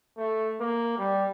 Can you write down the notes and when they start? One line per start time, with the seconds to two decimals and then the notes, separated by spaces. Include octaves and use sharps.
0.17 A3
0.60 A#3
0.98 G3